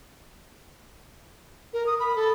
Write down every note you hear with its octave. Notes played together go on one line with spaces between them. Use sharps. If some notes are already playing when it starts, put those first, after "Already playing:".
A#4
D#6
B5
A4